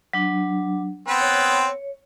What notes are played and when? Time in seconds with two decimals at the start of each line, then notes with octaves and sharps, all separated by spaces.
0.13 F#3 D4
1.08 B3 C4 B4
1.21 C#5